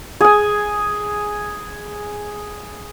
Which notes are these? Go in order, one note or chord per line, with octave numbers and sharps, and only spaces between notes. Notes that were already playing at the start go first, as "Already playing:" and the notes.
G#4 G#5